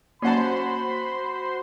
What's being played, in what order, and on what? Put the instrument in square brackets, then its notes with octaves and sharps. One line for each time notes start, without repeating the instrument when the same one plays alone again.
[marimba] A#3 [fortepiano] C#4 F#5 A5 [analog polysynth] F#4 C5 C6 [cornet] B5